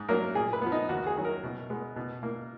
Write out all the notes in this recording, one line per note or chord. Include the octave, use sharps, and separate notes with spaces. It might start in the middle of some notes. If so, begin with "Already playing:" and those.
Already playing: G#2
F#3 A#3 A#4
A#2 G#4
B4
F3 B3
D#4
D#2 F#4
G#4
D#3 F#3
A#4
B2
G#3 B3
B2
A#3